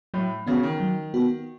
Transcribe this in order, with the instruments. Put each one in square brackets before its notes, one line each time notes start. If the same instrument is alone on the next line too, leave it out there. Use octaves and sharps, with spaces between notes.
[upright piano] A2 [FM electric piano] F#3
[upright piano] C#3 [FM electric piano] B3 F#4
[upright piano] D#3
[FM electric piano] F#3
B3 F#4